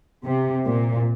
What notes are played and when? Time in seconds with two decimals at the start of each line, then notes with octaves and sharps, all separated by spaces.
0.25 C3
0.67 A#2